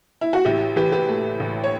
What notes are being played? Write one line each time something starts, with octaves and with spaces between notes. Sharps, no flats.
E4
F#4
A1 E4 G4
E3 G4 B4
G4 B4
A3
A1
C#5